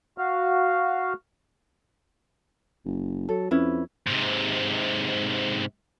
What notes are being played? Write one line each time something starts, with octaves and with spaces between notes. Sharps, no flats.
F#4 F5
F#1
F#3 A4
F2 C#4 E4 B4
G#2 C3